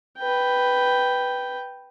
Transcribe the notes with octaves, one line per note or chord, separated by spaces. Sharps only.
B4 G5